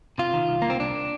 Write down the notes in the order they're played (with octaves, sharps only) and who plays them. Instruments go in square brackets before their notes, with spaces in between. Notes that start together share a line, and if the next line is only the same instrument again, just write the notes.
[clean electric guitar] C3 F4
D#3
C2
C2 A#3
C4
C2 D4